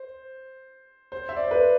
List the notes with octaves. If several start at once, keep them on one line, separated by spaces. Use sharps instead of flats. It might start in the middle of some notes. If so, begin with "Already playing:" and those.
Already playing: C5
C5
E5
D5
C5
B4